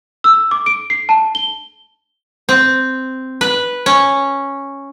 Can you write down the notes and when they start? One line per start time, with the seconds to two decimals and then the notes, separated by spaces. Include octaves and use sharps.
0.24 E6
0.51 D6
0.66 D7
0.90 C7
1.09 A5
1.35 G7
2.49 C4
3.41 B4
3.86 C#4